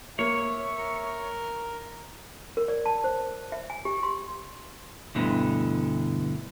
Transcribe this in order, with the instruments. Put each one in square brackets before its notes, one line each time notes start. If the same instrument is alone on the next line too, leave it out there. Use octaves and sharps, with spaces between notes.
[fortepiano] A#3 [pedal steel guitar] C#5 [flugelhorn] E5
[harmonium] A#4
[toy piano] A#4
D5
A5
C5
E5
G#5
G4
C6
[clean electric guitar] D2 G2 B2 D3 E3